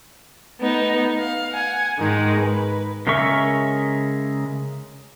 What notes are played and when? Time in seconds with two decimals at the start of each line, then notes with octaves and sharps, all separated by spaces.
0.58 A3 B3 D#4
1.18 F5
1.54 F#5 G#5
1.98 G#2 D#3 G#3
2.40 B4
3.07 C#3 G#3 A#4 E5 C#6